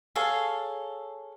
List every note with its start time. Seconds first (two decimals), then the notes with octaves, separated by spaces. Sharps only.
0.15 G#4 A4 C#5 F5